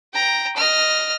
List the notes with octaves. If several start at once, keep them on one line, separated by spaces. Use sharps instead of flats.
G5 A#5
D#5 F6